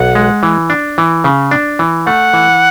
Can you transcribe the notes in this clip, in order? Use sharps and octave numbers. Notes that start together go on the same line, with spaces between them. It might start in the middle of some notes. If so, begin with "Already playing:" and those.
Already playing: B1 F#5
G#3
E3
D4
E3
C#3
D4
E3
A3 F#5
E3